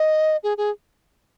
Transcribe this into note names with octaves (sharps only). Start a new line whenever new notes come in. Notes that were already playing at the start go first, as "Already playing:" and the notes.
Already playing: D#5
G#4
G#4